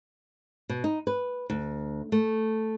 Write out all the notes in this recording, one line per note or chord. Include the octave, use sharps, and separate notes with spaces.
B2
D#4
B4
D2
A3